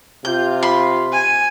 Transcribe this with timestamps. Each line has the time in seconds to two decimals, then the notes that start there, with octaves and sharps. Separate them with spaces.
0.25 C3 F4 G6
0.63 B5 C6
1.13 G#5